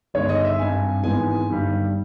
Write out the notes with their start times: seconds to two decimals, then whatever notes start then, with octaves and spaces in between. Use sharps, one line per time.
0.14 G1 G2 D#3 G#3 C#5
0.29 D#5
0.45 E5
0.59 G#1 G2 G3 G#5
1.03 G#1 G#2 E3 G#3 B3 G#5
1.48 G1 G2 D#3 G3